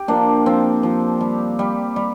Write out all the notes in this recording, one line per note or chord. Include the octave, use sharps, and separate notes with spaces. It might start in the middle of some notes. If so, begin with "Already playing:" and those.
Already playing: G4
F3 A#3 D4
F3 C4
F3
G3
G3
G3